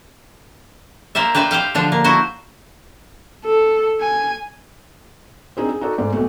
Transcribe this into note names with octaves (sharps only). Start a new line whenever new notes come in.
A#3 A#4 C5 D5 E5
G4 B4 C5 D5 E5
G4 C5 F5 G5
D3 F3 D4
A#3
E4 F#4 C5
A4
G#5
C4 D4 D#4 G#4 C5
G#4
D#4 F#4 A4 D5
G#2 A3 D5
B1 A3